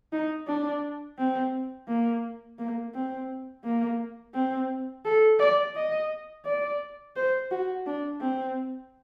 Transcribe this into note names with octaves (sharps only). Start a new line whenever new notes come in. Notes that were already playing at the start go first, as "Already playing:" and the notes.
D#4
D4
C4
A#3
A#3
C4
A#3
C4
A4
D5
D#5
D5
C5
F#4
D4
C4